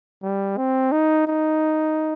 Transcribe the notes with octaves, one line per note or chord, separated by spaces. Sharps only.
G3
C4
D#4
D#4